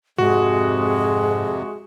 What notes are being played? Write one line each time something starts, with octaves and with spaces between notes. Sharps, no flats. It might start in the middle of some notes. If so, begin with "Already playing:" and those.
F2 G#2 C3 G#3 F#4